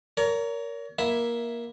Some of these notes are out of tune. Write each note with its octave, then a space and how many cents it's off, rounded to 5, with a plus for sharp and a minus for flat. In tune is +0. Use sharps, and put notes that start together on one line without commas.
A#4 +0 C#5 +35
A#3 +15 E4 +5 E5 +0